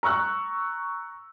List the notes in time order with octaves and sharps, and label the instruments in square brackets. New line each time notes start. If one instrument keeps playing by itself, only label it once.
[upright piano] A#5 C#6 E6 F#6